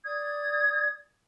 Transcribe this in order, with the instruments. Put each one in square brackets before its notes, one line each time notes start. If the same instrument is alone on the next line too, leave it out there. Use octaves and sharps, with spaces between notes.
[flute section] D5 D#6 G#6